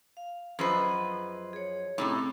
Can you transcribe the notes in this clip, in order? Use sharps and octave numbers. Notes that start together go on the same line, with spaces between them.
F5
F#2 F3 G#4 B4 C5 D#5
G#4 C#5
A2 C3 C4 C#4 D#4